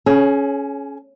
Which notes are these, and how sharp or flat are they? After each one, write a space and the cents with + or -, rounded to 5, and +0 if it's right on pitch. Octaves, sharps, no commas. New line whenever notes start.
C#4 +0 G#4 +40